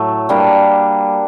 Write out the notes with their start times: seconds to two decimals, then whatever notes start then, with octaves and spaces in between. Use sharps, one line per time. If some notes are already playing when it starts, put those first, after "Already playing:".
Already playing: A2 F#3 A3
0.29 G3 A#3 D4